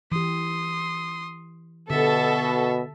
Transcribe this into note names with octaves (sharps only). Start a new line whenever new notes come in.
E3 G4 C6 D#6
B2 D3 G4 A4 E5